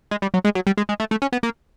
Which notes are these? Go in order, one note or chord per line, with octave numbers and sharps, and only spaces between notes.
G#3
G3
F#3
G#3
F#3
G3
G#3
G#3
A3
A3
C#4
B3
A#3